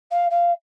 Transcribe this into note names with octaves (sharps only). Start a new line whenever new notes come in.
F5
F5